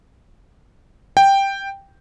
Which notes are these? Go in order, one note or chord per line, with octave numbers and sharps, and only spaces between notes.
G5